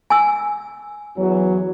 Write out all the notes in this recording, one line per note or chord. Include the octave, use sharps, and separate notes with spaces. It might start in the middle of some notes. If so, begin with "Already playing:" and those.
G#5 E6
E2 F#3